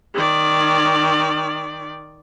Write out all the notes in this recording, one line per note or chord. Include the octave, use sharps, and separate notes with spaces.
D#3 D5